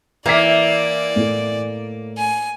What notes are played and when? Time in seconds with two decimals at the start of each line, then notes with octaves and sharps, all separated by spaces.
0.26 E3 A#3 D5 A#5 G#6 B6
1.16 A2 A3
2.17 G#5